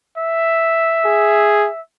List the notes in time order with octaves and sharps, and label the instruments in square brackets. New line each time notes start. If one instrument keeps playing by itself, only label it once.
[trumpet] E5
[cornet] G#4